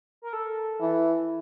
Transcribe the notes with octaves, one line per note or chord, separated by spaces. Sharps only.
A#4
A4
E3